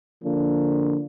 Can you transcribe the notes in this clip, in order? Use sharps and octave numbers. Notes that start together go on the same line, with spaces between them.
D3 F3 A#3 D4